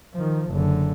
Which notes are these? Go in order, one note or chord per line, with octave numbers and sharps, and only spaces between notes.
D#3 F3
F#1 D3